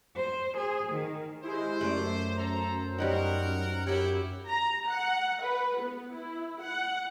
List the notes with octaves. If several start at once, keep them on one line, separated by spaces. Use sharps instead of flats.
C5
G#4
D#3
G#3 E4 G4 C5
F#2 A3 D5
A4 C5 A#5
G3 C#4 D#4 A#4 F#5
E4 G4 C#5 G5
A#5
F#5
B4
B3
E4
F#5